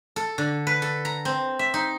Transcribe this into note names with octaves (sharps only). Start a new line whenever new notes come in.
A4
D3
B4
A4
A#5
C4
E5
D#4